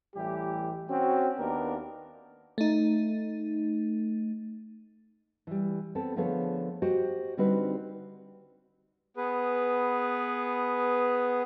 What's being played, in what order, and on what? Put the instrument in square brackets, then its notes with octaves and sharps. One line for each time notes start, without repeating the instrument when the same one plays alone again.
[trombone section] A1 E3 G3 G4
C4 C#4 F#4
D#2 A#3 B3 D4 A#4
[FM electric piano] A3 D#4
[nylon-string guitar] E3 G3
B3 C4 A4
D3 F3 A3 B3 G#4 C#5
F#4 G4 C5 D#5
D3 G3 C4 D#4 F#4 B4
[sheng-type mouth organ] B3 G#4 B4